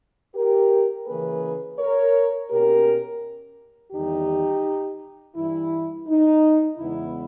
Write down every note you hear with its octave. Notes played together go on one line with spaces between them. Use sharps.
G4 A#4
C#3 E3 A#3 C#4 G#4 B4
A#4 C#5
B2 A#3 C#4 G4 A#4
E2 D#3 G3 D#4 G4
G2 E3 G3 E4
D#4
E2 C#3 G#3 B3 E4